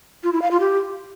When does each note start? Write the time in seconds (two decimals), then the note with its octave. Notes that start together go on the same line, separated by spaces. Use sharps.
0.23 F4
0.33 E4
0.42 F5
0.51 F4
0.60 G4